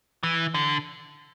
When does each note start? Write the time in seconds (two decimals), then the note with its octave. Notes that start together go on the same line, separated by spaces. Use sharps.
0.23 E3
0.54 D3